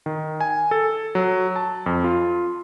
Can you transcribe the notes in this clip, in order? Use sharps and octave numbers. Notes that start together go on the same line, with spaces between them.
D#3
G#5
A4
F#3
A5
F2
F4